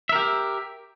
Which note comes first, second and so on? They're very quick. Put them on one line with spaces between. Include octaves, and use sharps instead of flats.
E5 A#4 G4